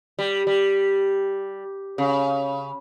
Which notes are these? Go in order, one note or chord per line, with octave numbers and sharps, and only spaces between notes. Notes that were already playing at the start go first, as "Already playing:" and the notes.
G3
G3
C#3